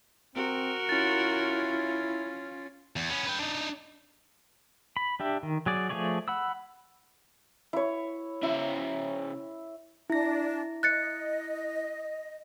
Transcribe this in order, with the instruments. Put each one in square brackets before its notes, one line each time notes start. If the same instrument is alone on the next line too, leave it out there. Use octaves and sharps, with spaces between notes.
[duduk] C4 [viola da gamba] F#4 A#4 [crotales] D7
[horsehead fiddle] C#4 F4 [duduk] E4 [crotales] A6
[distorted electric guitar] E2
B3 C#4
B4 G5
D4 D#4
[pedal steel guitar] B5
D4 G4 E5
D#3
F#3 G#4 D5
F3 A3 G#4 C#5 D5
F#5 B5 E6
[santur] E4 C#5
[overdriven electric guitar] C#3 E5 [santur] E4
[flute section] D4 [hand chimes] E4 A#6
[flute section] D#5 [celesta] F#6 A6 C#7